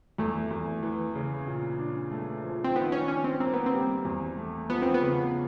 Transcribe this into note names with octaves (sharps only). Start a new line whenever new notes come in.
E2 A3
E2
E3
C#3
A#2
D4
A3
F3
C4
D#3 B3
C#4
C#4 D4
C4
A#3 C4
B3
C4
G3
E2
A3
F3 B3
C4
B3
C#3